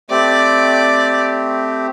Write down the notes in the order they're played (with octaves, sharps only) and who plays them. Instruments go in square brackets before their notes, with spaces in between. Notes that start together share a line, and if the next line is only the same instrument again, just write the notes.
[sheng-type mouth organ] A3 C4 G4 [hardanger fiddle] D5